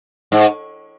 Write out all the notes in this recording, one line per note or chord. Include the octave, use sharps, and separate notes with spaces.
G#2